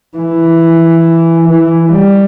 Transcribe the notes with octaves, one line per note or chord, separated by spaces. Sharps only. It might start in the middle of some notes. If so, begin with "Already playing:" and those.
E3
E3
G3